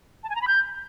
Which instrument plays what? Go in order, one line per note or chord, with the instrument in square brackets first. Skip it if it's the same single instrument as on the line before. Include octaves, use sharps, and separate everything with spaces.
[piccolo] A5
G#5
A#5
B5
G6